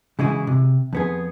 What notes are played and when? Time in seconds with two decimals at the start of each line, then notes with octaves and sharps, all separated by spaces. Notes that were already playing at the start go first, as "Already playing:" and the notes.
0.19 C#3 E3 G#3 E4 F#4 G#4
0.47 C3
0.93 F2 B3 G#4